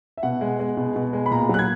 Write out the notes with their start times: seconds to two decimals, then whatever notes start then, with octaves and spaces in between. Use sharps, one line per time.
0.17 E5
0.23 B2 F#5
0.41 G#3
0.59 G#3
0.77 B2
0.96 B2
1.13 G#3
1.26 B5
1.31 A#2 A#5
1.49 F#3 F#6
1.59 G#6